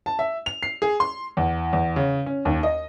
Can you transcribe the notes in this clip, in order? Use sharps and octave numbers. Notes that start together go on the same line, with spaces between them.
A5
E5
F7
C7
G#4
C6
E2
E2
C#3
C#4
D#2
D#5